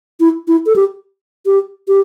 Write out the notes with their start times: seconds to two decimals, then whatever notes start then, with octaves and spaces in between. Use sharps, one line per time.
0.20 E4
0.48 E4
0.66 A4
0.76 G4
1.46 G4
1.88 G4